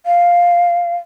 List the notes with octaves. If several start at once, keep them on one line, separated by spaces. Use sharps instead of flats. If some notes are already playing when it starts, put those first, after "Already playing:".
F5